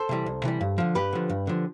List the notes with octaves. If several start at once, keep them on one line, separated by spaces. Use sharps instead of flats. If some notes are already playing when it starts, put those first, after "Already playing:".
Already playing: A4 C5
C3 E3 G3
C2
C3 E3 G3
G2
D3 F3
G2 G4 B4
D3 F3
G2
D3 F3